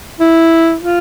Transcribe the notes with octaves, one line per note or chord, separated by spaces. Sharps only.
E4
F4